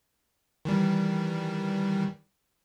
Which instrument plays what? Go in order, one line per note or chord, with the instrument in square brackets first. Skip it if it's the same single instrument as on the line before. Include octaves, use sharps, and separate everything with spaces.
[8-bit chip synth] D#3 E3 G3